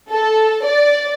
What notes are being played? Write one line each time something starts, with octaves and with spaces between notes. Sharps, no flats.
A4
D5